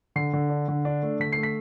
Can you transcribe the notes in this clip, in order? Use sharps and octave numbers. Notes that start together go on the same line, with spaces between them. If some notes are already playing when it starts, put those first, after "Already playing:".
D3 C7
D3
D4
D3
D4
A3
D3 B6
A3 C7
B6